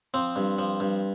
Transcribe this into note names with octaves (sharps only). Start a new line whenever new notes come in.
F3 C4
G2
F3
G2